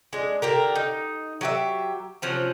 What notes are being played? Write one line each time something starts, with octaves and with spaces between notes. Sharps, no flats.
G#3 D4
D3 G4 A#4
D#4
F#3 G4 E5
C3 F3 F#3 C#4